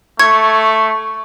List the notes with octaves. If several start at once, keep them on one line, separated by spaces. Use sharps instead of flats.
A3 C#6 G#6